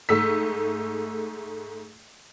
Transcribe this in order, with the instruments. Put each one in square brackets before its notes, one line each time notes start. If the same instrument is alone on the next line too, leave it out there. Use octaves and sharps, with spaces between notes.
[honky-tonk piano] G#2 A3 E6 B6